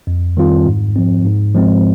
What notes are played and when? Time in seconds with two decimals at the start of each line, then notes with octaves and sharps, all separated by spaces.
0.07 F2
0.37 D#3 G3 C4 F4
0.66 G#2
0.96 F3 C4
1.25 G#2
1.54 F3 G#3 C4